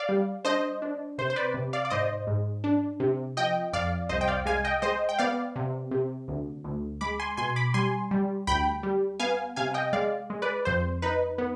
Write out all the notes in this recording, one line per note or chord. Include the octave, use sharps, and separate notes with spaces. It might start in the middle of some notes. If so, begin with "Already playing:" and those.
Already playing: D5 F5
G3
D4 C5 D#5
D4
C3 C5
C5
B4 D5
C3
D5 F5
D5
G#2 C5 D#5
G#2
D4
C3
F3 D#5 G5
F2 D5 F5
C2 C5 D#5
G5
D5 F5
G#3 F5 G#5
D#5 G5
G#3 C5 D#5
G5
B3 D5 F5
C3
C3
D2
D2
G#3 B5 D6
G#5 C6
B2 G#5 C6
B5 D6
G3 G#5 C6
G3
D2 G5 B5
G3
B3 F5 G#5
C3 F5 G#5
D#5 G5
G#3 D5 F5
G#3
B4 D5
F2 C5
D#4 B4
B3